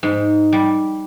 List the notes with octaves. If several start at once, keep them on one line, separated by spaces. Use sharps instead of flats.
G#2
G3